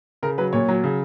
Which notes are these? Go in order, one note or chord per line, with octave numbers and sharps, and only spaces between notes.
C#3 A#4
F#3 B4
A#2 C#5
F#3
C#3